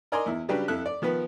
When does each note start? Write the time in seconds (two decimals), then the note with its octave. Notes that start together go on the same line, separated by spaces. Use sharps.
0.12 A#4 D5 D#5 G#5 A#5 C6
0.26 E2 E4
0.49 C#3 F#3 G3 D4 G4 B4
0.68 F2 E4 A4 E5 F#6
0.86 D5
1.02 D#3 F3 B3 B4